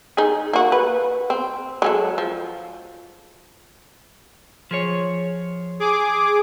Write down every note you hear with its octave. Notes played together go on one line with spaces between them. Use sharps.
D#4 G#4
A#3 F#4
B4
C4
F#3 G#3 A4
F3
F3 G#4 C#5
G#4 D6